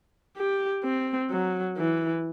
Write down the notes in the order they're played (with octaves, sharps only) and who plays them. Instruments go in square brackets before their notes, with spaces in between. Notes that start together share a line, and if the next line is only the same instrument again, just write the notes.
[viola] G4
C4
F#3
E3